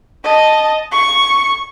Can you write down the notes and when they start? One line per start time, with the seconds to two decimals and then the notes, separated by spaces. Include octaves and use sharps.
0.24 D#5 A5
0.92 C#6